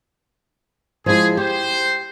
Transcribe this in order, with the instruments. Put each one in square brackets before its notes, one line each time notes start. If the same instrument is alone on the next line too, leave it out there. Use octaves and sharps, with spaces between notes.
[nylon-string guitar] F3 G#3 E4 [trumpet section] G#4
[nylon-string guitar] G4 [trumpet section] C5